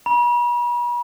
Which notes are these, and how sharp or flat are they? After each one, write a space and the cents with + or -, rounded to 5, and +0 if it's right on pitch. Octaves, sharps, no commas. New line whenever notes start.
B5 -40